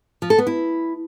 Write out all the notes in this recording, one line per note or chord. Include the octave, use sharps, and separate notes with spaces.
F3
A4
B3
E4